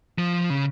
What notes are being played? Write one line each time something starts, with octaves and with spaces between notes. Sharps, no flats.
F3
C#3